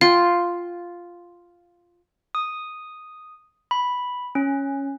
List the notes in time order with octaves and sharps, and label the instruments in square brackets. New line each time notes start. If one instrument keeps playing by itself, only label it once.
[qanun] F4 G5 [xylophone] F5
[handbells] D#6
B5
C#4